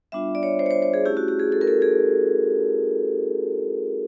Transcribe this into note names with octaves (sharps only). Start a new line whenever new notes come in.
G3 B3 D4 F4 E5
D5
C#5
C5
C#5
C5
C5
G#4
A3 C#4 E4 G4
F#4
G4
G#4
A4
A#4
A4
G#4